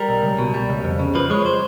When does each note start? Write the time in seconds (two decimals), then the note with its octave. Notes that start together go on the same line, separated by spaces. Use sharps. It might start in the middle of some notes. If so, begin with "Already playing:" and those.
Already playing: G3 A#4
0.09 B1
0.23 C#2
0.39 B2
0.54 G3
0.69 C#2
0.84 F2
0.99 C#3
1.15 F3 B4
1.30 G#3 C#5
1.46 C5